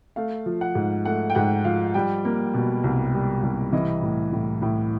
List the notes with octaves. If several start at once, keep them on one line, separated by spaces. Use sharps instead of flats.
A3 F5
F3
F#5
G#2
A3 F#5
G5
G#2 F#5
F3 F5
G3 G5
A#3
B2
C2
G3
C2
E3 D#5
A2
A2
A2